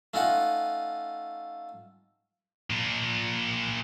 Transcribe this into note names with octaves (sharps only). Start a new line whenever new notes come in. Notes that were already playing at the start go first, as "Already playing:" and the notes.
A3 C#4 D#4 F4 F#5
A#2 D4